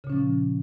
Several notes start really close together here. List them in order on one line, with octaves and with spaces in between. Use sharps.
C#3 A#2 C#4 F3